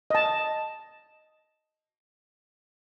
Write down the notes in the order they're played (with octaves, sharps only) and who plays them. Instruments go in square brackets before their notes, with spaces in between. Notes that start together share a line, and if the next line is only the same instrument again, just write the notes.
[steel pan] D#5 A5